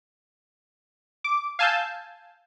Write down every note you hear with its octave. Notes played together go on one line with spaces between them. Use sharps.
D6
F5 G#5 A5 E6 G6